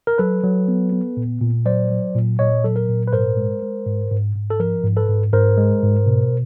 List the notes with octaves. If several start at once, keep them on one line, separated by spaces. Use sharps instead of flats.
A#4
F#3 A4 B4
F#3
B3
B3
A#2
A#2
F#3 C5 D5
F#3
A#2
A#2 C#5 D#5
F#3 A4
A#4
A#2
B4
G#2 A#4 C5
G#3
G#3
G#2
G#2
G#2
A4
F3 A#4
G#2
A4 B4
G#2
G#2 A#4 C5
G#3
G#2
B2